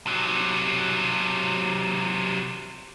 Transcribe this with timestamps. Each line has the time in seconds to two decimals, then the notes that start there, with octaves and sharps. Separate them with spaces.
0.07 C3 F#3